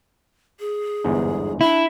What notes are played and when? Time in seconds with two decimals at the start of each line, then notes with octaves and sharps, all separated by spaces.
0.60 G#4
1.04 G1 E2 G#2
1.61 D4 E4